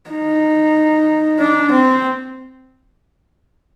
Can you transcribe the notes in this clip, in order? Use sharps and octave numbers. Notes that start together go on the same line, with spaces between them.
D#4
D4
C4